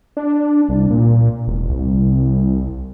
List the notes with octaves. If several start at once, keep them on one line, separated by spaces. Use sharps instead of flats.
D4
C2
A#2
E1
C2